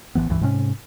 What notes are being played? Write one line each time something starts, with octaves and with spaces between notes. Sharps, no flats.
A1 B2 E3 B3
C#2 G2 E3
G#2 C3 C#4